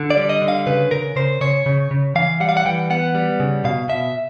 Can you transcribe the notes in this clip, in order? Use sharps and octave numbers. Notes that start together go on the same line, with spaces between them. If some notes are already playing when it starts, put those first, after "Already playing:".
Already playing: D3
D5
G3
D#5
D3
F5
C#3 B4
C#3 A#4
C#3 C5
C#3 C#5
C#3
C#3
E3 F5
G3 F#5
F5
F#5
E3 G5
B3 F#5
G3
C#3
B2 F5
B2 E5